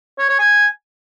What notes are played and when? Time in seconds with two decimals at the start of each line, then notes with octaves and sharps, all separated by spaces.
0.19 C#5
0.29 C#5
0.39 G#5